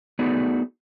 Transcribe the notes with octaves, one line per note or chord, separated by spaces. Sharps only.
A3 B3 D#4 F#4 G#4 D5